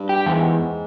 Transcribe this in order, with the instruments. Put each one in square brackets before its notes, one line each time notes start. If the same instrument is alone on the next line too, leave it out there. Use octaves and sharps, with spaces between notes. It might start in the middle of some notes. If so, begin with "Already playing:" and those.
Already playing: [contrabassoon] G2
[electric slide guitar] G4
[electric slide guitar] E2 [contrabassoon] G#2